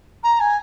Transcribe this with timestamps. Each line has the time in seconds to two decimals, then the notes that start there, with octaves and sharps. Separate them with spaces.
0.23 A#5
0.39 G#5